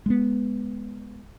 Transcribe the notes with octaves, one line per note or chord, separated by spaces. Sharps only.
G#3 A3 B3